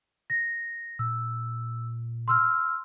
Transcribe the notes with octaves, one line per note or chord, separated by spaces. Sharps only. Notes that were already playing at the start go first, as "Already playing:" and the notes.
A#6
A#2 E6
C6 E6 F6